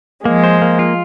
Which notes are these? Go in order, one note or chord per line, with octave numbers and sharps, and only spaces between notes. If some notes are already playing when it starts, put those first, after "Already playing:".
F3 G#3 A#3
C5
A#3
F4